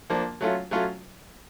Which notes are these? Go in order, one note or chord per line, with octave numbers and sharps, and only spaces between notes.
F3 A#3 D4
F#3 A3 C#4 F4
F#3 A3 C#4 F4